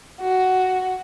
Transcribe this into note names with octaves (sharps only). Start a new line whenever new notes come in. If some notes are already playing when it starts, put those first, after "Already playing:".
F#4